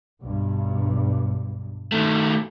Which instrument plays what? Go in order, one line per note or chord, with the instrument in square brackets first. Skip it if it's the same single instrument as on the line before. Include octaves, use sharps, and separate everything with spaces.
[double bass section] B1 G2
[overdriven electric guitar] D#3 A3